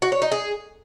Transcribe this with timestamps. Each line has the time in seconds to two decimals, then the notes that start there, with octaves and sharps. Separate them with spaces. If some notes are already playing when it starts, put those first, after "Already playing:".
0.02 F#4
0.12 C#5
0.22 D#4
0.32 G#4